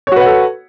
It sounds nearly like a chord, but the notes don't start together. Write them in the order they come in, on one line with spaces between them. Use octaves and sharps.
C#5 F#4 B4 F#5 A4